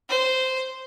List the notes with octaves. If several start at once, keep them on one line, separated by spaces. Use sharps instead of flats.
C5